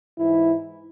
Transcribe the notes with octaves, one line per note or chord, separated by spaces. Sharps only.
G#2 E3 E4